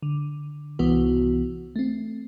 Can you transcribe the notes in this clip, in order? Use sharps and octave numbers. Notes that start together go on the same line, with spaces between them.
D3
C2 E3 B3 F#4
A3 C4